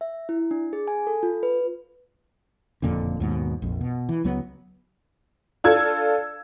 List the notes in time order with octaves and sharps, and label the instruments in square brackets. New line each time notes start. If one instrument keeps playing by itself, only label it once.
[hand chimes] E5
E4
D4
G#4
G#5
A4
F4
B4
[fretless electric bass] F#1 F2 A#2 D3
D#2 G#2 B2
A#1 F2
B2
E3
C#2 F#3 B3
[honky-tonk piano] D4 F4 A4 E6 G#6